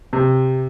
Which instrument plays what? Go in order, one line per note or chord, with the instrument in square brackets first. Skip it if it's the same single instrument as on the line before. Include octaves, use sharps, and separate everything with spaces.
[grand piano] C3